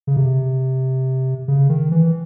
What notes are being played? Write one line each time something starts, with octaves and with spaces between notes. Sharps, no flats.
C#3
C3
C#3
D#3
E3